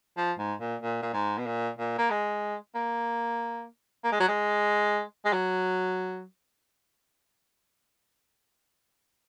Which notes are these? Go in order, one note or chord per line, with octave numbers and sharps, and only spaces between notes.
F3
G#2
A#2
A#2
A#2
G#2
B2
A#2
A#2
A#3
G#3
A#3
A#3
G#3
F#3
G#3
G#3
F#3